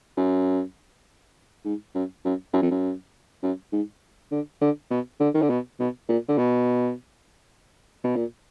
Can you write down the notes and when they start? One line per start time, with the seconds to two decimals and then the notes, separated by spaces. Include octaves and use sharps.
0.17 F#2
1.65 G#2
1.95 F#2
2.25 F#2
2.53 F#2
2.62 F2
2.71 F#2
3.43 F#2
3.72 G#2
4.31 D3
4.61 D3
4.91 B2
5.20 D3
5.34 D#3
5.42 D3
5.50 B2
5.79 B2
6.09 A#2
6.28 D3
6.38 B2
8.04 B2
8.16 A#2